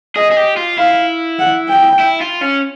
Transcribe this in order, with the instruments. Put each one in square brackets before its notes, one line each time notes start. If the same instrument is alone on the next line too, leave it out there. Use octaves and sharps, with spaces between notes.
[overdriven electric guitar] G#4 [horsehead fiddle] D#5
[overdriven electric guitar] G#4
G4
F4
[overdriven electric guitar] E4 [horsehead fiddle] F5
[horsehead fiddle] F#5
G5
[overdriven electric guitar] E4
F4
C#4